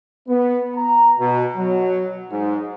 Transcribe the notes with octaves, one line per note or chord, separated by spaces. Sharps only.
B3
A#5
B2
F#3
G#2